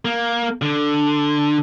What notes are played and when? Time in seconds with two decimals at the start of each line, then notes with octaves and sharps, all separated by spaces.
0.05 A#3
0.62 D3